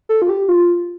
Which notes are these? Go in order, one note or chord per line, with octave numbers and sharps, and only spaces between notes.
A4
F4
G4
F4